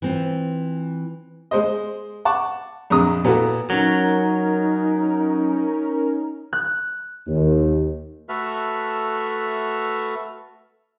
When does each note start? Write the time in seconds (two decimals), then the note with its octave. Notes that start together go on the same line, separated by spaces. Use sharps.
0.02 E3 C4 F4
1.51 G#3 C5 D#5
2.25 F#5 A5 C#6 D6
2.90 A#1 F2 A#5 D#6
3.24 A#2 B3 E4 F#4 A4
3.70 F#3 C#4 D#4 A#4
6.53 F#6
7.28 D#2
8.29 A3 F#4 A4 B4 E5 F6